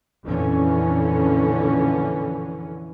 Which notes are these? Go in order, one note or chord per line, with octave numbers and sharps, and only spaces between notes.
F2 A#2 D3 E3 C#4